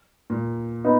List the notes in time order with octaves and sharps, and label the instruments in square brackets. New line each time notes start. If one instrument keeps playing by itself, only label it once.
[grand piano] A#2
[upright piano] B3 D#4